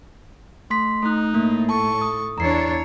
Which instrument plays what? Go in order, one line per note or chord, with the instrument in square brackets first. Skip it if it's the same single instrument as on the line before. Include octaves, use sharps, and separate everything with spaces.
[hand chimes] A3 C6 B6
[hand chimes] A3 F#6 [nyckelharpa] D#4
[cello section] A2 [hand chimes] A#3
[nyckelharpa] A4 C#6 [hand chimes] A5
[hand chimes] D#6
[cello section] E2 D4 C#5 [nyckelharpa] E4 [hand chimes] A#5 C7